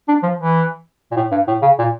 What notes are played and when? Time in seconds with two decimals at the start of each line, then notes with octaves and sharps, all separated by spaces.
0.08 D4
0.23 F3
0.39 E3
1.11 A#2
1.16 A2
1.31 G2
1.47 A2
1.62 C#3
1.79 A#2